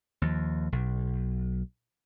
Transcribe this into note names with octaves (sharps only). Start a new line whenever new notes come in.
D#2 F3
B1